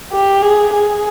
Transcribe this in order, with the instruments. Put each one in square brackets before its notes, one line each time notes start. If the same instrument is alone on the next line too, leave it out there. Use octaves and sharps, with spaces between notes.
[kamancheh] G4
G#4
G#4